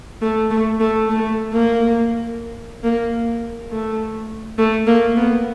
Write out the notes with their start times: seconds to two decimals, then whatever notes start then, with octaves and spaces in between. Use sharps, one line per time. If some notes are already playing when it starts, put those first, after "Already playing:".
0.22 A3
0.51 A3
0.80 A3
1.09 A3
1.53 A#3
2.83 A#3
3.71 A3
4.58 A3
4.87 A#3
5.17 B3